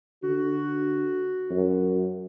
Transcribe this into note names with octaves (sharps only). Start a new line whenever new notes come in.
D3 F#4
F#2